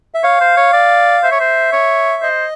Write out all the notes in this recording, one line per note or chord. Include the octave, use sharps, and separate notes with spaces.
E5
C#5 F5
C5
C#5
D5
C5 E5
C#5
C5
C#5
C5 D#5